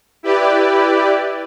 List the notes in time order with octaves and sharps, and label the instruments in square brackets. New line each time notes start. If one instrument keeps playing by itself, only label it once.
[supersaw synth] E4 G4 B4 D5